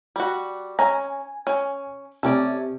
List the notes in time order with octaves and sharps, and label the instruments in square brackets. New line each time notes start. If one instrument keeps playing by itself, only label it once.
[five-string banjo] G3 F#4
[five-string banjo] C#4 A#5 [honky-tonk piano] G#5
[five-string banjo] C#4
[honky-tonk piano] C3 [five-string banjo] A3 C#4 D5